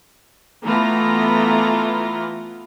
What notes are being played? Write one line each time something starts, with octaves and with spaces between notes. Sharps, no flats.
E3 A3 B3 F4 A#5